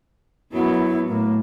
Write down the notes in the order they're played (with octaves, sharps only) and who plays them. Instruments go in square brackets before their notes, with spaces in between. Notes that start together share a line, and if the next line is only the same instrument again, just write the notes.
[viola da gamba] F#2 F#3 B3 [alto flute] E4
[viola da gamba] A2 [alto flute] A#3